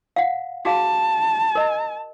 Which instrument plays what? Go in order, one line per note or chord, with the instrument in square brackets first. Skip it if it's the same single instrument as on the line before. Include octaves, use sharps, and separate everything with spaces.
[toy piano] F5 F#5
[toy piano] F#4 G#4 F5 [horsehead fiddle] A5
[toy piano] A#4 D#5